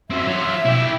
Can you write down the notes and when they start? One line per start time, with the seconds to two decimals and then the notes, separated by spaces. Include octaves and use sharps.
0.11 F#2 C4 E5
0.27 F#3 F4
0.65 B2 E4 G4